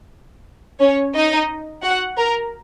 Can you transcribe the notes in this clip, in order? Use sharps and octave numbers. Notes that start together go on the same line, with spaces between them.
C#4 C#5
D#4 D#5
F#4 F#5
A#4 A#5